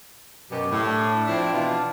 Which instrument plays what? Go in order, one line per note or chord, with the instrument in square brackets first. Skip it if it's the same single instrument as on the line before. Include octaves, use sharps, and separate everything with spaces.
[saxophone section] F#2 B2 [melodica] G4
[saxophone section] A2
[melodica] D4
[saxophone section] F3 C4 E4
B2 E3 F4